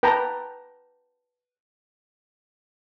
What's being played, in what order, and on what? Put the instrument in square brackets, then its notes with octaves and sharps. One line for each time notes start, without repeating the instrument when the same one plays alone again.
[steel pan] B4 G5 A5 A#5